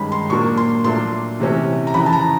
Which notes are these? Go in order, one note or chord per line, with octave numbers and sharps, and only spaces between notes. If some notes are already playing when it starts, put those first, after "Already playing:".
Already playing: G2 D#3 G#3 C#4 B5
C6
A#2 F#3 A#3 D4 C#6
C6
A#2 F#3 A3 D4 C6
C3 E3 A3 C#4
A#5
F2 C#3 E3 B5
A5
A#5